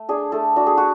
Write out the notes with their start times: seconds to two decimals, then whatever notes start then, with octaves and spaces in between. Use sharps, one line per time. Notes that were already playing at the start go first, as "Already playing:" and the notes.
Already playing: A3
0.09 D4 G#4
0.32 A3 A4
0.56 D4 F#4
0.67 G#4
0.77 F#4